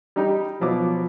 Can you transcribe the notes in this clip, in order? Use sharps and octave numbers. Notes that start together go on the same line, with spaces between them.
G3 D#4 G4
B2 F3 F#3 D6